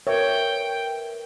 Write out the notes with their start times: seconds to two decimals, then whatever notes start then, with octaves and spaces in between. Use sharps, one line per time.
0.07 A#4 B4 C#5 E5 G5